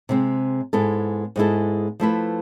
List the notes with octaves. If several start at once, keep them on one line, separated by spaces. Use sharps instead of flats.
C3 G#3 C4
G#2 G#3 B3 E4 A4
G#2 G#3 B3 E4 A4
F3 A3 E4 B4